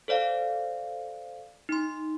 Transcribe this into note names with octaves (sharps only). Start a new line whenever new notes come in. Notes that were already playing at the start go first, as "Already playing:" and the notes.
A4 C5 D5 F5
D#4 C6